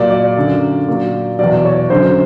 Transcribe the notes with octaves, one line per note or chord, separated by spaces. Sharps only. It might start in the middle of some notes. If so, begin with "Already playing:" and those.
Already playing: A#2 F#3 D5
D5
F#2 D3 F#3
A#2 F#3
E2 B2 F#3 D5
C#5
F#2 D3 F#3 C5